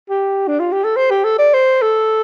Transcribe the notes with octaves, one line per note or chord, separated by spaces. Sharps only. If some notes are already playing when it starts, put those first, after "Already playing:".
G4
D4
F4
G4
A4
C5
G4
A4
D5
C5
A4